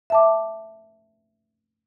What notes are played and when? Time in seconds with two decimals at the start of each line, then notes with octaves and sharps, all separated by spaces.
0.10 E5 A5 D6